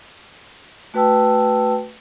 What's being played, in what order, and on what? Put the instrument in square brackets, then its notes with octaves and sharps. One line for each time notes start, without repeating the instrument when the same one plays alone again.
[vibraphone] A3 F#4 B4 G5 A5 E6